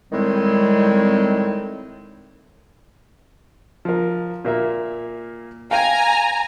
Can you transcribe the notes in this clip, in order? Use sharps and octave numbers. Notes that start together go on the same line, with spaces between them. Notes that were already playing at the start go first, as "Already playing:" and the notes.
A2 D#3 G3 G#3 C4
F3 A#4
A#2 A#3 E5
F5 G5 G#5 A#5